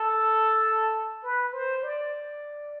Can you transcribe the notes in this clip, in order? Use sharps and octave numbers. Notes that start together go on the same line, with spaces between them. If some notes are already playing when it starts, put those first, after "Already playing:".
Already playing: A4
B4
C5
D5